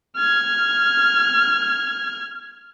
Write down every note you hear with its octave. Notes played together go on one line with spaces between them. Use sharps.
F6 G#6